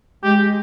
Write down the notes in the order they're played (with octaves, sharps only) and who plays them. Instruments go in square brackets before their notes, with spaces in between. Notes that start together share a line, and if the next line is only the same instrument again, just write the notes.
[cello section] G#3 [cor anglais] G4